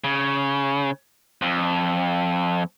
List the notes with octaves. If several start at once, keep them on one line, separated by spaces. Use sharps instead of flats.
C#3
F2